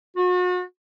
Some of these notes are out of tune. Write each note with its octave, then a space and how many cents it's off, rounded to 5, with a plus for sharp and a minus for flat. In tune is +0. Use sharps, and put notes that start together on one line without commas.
F#4 -40